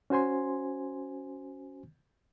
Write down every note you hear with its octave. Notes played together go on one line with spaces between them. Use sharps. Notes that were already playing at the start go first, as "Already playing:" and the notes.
C#4 F#4 C5 G#5 C6